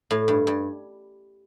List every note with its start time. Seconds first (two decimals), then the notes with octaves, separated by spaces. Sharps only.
0.11 A2
0.28 G2
0.47 G2